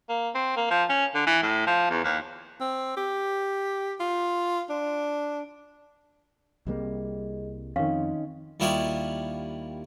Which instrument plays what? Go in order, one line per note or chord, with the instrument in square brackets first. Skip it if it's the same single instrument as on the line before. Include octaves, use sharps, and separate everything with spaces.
[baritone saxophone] A#3
C4
A#3
F3
C#4
D3
E3
A2
F3
E2
D#2
[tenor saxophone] C4
G4
F4
D4
[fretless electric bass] C2 G3 A#3 [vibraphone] C4 G#4 D#5
[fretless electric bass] F2 [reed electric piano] D#3 C#4 [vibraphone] C4 D#4 D#5 [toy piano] F5
[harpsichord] D#2 G3 E4 F4 C#6 D#6